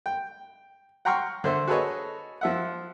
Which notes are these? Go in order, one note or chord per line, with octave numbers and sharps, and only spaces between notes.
G5
F#5 G5 A#5 C6 C#6 F6
D3 C5 E5
F#4 G#4 A4 B4 C#5 D#5
F3 E5 F#5